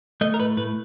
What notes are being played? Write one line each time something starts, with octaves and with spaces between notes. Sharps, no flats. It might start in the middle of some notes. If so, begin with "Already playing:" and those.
A3 D#5
A#4
A2 B4
A2 B4